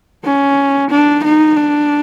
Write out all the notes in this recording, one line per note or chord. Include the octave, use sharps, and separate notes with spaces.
C#4
D4
D#4
D4